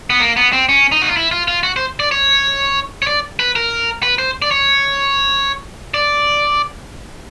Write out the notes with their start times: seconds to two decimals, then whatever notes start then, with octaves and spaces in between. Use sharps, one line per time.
0.10 B3
0.20 A#3
0.37 B3
0.53 C4
0.69 C#4
0.92 D#4
1.02 F#4
1.09 F4
1.17 E4
1.31 F4
1.48 F4
1.63 F#4
1.76 C5
2.00 D5
2.11 C#5
3.02 C#5
3.07 D5
3.39 B4
3.56 A#4
4.03 B4
4.18 C5
4.42 D5
4.51 C#5
5.94 D5